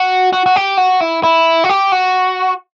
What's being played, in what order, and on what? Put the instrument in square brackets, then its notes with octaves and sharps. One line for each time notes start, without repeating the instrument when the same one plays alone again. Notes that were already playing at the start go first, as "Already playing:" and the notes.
Already playing: [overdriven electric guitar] F#4
F#4
F#4
G4
F#4
E4
E4
F#4
G4
F#4